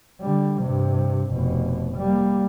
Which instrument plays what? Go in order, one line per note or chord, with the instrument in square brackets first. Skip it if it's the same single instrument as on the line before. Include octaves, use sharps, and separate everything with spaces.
[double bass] D3 G3
G2 C3
F1 B2
G3 A#3